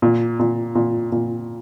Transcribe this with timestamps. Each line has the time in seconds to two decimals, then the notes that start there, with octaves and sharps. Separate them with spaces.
0.02 A#2
0.39 A#2
0.75 A#2
1.12 A#2